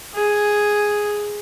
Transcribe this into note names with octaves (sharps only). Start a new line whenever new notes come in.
G#4